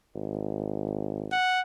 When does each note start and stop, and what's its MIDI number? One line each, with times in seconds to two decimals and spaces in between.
0.15 1.32 32
1.32 1.61 78